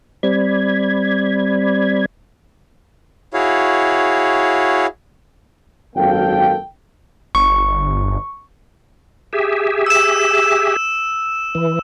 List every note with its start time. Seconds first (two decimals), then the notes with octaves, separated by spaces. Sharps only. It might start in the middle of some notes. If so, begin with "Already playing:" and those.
0.23 G3 C4 D5 B5 G#6
3.34 E4 F#4 G#4 C#5 F5
5.96 G#1 F#2 A#3 A4 F5 G5
7.35 G1 C#6
9.33 G4 G#4 E5
9.86 E6 E7
11.55 E3